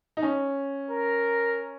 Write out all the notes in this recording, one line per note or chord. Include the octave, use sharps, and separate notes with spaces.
D#4
C#4
A#4